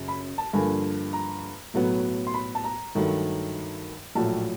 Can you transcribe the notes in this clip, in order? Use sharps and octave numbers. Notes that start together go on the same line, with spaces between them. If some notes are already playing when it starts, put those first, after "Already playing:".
Already playing: F#2 C#3
B5
A5
G2 D3 F3 A#3 G#5
A#5
B1 A2 F#3 B3
C6
B5
A5
A#5
G2 D#3 F#3 A3
A#1 A2 F#3 A5